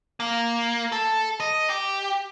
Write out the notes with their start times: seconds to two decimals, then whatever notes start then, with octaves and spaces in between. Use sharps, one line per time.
0.20 A#3
0.92 A4
1.40 D#5
1.69 G4